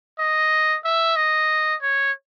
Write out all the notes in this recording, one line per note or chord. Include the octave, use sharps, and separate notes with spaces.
D#5
E5
D#5
C#5